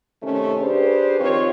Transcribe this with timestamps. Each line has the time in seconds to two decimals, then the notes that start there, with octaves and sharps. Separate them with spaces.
0.22 C3 D#3 A3 C#4
0.60 D4 G4 G#4 B4 C5
1.19 F2 D#3 C4 F4 G4 C#5